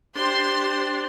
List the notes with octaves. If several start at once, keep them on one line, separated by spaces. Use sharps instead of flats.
D4 G4 C5 C6